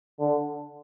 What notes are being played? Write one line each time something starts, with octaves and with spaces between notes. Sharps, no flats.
D3